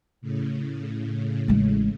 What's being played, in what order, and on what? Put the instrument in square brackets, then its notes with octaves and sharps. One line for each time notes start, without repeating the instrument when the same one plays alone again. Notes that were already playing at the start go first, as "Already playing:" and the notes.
[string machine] A2 C#3
[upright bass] A1 G#3